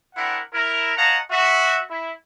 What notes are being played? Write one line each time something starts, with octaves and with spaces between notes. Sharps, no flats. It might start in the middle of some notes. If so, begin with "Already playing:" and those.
C4 D4 E4 A#4 F#5
E4 A#4
C#5 D#5 F5 F#5 A5 A#5
F#4 E5
E4